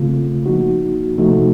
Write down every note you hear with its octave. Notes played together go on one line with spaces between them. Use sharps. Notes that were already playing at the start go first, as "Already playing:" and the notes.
Already playing: C#3 A3 C4 F4
F3 A#3 D#4 F#4
C3 F3 A3 D#4 F#4